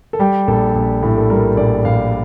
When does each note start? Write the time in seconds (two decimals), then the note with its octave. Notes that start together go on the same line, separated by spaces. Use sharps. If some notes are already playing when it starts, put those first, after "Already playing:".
0.13 A4
0.19 G3 G4
0.47 A#1 A4
0.75 A#1
1.03 A2
1.18 A4
1.30 G3 A#4
1.57 A#1 D5
1.85 A#1 F5